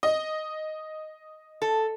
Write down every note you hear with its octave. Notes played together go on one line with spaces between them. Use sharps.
D#5
A4